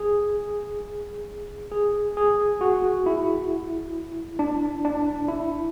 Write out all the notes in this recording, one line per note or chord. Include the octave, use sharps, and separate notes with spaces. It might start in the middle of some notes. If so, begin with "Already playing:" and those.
Already playing: G#4
G#4
G#4
F#4
E4
D4
D4
E4